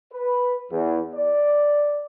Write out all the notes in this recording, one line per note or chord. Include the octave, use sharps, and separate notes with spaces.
B4
E2
D5